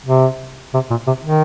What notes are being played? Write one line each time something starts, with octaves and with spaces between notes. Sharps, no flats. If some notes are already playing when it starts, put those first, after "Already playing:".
C3
C3
A#2
C3
D#3